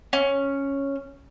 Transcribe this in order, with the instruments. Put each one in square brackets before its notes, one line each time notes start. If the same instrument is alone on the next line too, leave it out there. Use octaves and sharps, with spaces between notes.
[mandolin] C#4